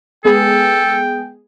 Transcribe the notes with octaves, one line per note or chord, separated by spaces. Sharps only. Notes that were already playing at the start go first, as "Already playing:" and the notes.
G#3 B3 G#4 A4 G5